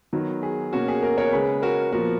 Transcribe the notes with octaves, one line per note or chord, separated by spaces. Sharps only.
D#3 F#3 B3
G#4
B2 A#3 C#4 F#4
G#4
F#4 A#4
A#4 C#5
C#3 G#3 C#4 G#4 B4
F#4 A#4
A#2 F3 B3 F#4 A#4